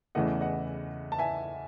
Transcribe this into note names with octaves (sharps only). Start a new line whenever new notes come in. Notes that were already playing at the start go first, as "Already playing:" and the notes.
E2 C#3 E3 A3 D#5 F#5
D#5 F#5
A5
E5 G#5